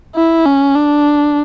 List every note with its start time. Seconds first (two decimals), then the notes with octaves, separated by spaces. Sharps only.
0.15 E4
0.46 C#4
0.75 D4